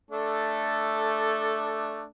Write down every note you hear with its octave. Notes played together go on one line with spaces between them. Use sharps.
A3 D4 A4